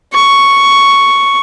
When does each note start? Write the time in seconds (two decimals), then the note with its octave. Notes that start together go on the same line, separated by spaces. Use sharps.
0.14 C#6